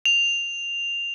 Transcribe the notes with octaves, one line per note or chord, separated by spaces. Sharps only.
F7